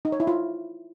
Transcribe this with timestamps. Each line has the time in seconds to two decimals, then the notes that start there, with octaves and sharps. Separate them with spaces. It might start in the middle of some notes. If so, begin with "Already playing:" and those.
0.05 D#4
0.12 C#5
0.20 E4
0.27 F4